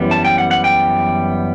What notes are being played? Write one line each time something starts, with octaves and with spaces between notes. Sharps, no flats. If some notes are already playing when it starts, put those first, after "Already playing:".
Already playing: F#2 E3 G3 B3
A5
G5
F#5
F#5
G5